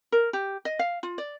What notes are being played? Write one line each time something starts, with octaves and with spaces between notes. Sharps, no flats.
A#4
G4
D#5
F5
F4
D5